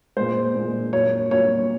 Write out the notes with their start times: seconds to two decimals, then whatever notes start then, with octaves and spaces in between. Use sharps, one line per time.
0.16 A#2 G#3 C5
0.55 A#2 G#3
0.93 A#2 F#3 C#5
1.31 A#2 F#3 C#5